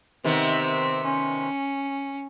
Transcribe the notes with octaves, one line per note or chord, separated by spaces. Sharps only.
C3 D#3 B3 C4 E5
C#4